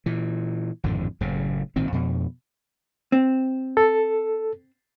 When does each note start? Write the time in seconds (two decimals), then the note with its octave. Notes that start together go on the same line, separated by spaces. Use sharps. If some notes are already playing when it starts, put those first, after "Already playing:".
0.06 A#2 E3
0.84 G#1 F2 A2 D3
1.21 F#1 F#2 A2 C#3
1.76 G#1 A#2 D#3 C4
1.92 F2 B2
3.12 C4
3.77 A4